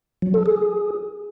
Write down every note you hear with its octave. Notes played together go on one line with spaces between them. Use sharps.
F#3
A4
G#4